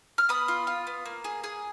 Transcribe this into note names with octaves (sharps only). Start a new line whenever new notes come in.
F6
B3 B5 D#6
F4
F4
B3
A#3
G#4
G#4